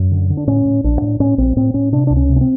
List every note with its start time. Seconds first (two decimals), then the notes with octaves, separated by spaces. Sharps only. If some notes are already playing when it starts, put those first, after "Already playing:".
Already playing: F#2
0.11 D3
0.30 D3
0.37 D4
0.47 A2 C#4
0.66 A2
0.84 A#1 D4
1.02 A2
1.20 A2 C#4
1.38 A#1 C4
1.56 A2 C4
1.74 A2 C#4
1.92 C3 D4
2.07 C#2 D4
2.17 C#4
2.29 C3
2.36 C#4
2.41 C4